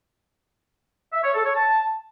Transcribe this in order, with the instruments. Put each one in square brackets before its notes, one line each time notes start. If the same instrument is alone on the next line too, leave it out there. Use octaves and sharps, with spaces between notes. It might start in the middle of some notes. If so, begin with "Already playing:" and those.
[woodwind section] E5
C#5
A4
C#5
A5